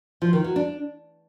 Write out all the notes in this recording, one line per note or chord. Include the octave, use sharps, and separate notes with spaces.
F3
D#3
F#3
D4